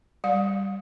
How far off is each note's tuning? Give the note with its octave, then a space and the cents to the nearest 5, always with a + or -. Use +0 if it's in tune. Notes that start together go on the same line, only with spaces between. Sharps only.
G3 +0 F5 +40